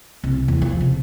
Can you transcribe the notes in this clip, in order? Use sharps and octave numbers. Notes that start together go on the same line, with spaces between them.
C2
E2
F3
C3